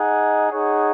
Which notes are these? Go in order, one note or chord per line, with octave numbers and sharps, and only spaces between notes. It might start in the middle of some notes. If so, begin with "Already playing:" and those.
Already playing: D#4 G#4 D#5 F#5
D#4 G#4 C#5 F#5